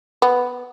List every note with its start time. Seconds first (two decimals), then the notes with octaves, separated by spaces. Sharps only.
0.22 B3